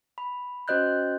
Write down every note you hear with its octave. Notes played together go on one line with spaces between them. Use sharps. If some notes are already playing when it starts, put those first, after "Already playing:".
B5
C#4 F#4 C5 D#5 F#6 G6